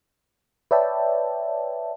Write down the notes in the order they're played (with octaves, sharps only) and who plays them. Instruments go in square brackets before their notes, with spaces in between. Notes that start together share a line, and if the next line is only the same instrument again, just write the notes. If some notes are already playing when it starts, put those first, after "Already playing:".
[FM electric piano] B4 C#5 D5 E5 G5 A5